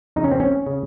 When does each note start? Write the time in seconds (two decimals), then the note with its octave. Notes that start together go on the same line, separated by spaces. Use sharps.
0.16 F2 C#3 D#4
0.24 C#4
0.31 C4
0.40 C#4
0.66 C#3